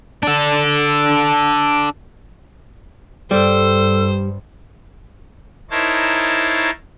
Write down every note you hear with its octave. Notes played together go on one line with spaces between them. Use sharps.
D4 A4
G2 G3 A4 C5
D#4 E4 A#4 C5 C#5 A5